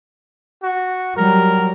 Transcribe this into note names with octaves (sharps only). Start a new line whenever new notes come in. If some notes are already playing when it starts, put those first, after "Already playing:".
F#4
F#3 G3 A#4